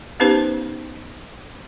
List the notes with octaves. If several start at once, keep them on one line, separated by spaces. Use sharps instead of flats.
B3 C#4 D#4 G4 B4 C5